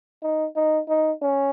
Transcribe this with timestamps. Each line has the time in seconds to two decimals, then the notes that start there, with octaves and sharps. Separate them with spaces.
0.23 D#4
0.56 D#4
0.88 D#4
1.22 C#4